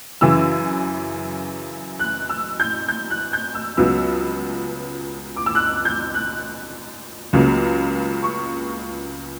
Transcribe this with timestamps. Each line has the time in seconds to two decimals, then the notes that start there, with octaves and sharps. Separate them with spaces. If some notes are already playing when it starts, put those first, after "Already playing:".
0.21 F#2 C#3 E3 E6
1.99 F#6
2.29 E6
2.60 G6
2.88 G6
3.10 F#6
3.33 G6
3.55 E6
3.77 C#2 C#3 F#3 B3 E6
5.36 D6
5.46 E6
5.55 F#6
5.85 G6
6.14 F#6
7.33 C#2 C#3 F#3 A#3
8.23 C#6